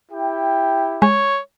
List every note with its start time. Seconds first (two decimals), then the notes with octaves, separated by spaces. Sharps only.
0.11 E4 G4 G5
1.02 G#3 C#5